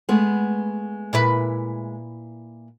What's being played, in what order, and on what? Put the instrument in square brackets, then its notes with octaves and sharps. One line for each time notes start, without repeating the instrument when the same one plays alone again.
[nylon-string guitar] G#3 A3 B3
[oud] A#2 E4 B4